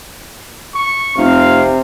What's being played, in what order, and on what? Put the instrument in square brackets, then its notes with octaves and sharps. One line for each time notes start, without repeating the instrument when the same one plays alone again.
[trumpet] C#6
[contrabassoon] F1 [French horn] C3 [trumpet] F5